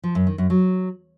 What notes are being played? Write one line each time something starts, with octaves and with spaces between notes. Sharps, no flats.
F3
F#2
D#3
F#2
F#3